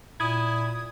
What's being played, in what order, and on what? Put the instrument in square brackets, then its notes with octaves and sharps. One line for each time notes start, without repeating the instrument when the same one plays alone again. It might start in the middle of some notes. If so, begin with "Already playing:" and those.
[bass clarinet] A#2 [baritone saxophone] E4 [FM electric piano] D#6 G#6